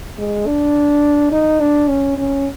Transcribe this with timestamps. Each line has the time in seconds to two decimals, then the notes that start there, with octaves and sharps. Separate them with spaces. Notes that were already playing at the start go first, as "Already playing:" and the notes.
0.18 G#3
0.46 D4
1.32 D#4
1.60 D4
1.88 C#4
2.18 C#4